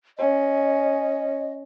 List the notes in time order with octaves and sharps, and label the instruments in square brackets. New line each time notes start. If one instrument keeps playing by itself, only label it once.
[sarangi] C#4 [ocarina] D#5